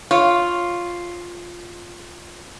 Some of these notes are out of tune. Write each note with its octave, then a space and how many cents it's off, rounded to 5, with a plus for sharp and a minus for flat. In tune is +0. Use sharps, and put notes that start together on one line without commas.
F4 +0 C#5 +0